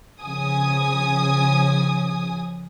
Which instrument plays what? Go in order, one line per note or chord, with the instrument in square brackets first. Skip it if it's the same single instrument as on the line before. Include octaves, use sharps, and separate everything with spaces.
[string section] C#3 F3 G#5 D#6